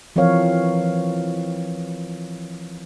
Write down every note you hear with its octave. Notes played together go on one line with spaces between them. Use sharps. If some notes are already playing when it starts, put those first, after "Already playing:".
E3 F3 C4 A#4 C#5 F5